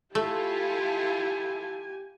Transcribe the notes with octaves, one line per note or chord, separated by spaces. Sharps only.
A3 E4 F4 G4 A4 G#5